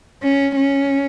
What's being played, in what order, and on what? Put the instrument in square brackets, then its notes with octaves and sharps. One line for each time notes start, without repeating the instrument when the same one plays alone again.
[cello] C#4
C#4